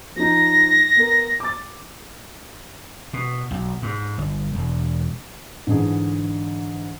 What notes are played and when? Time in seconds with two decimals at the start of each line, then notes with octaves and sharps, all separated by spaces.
0.16 F3 D#4 A#6
0.96 B3 A#4
1.40 D6 A6
3.13 B2
3.51 B1
3.82 G#2
4.18 G1
4.55 E1
5.67 G#2 D3 E3 G#4